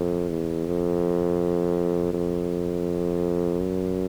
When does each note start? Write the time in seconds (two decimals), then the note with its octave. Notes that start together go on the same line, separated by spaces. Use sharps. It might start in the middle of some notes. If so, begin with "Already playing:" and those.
Already playing: F2
0.30 E2
0.67 F2
2.13 F2
3.60 F#2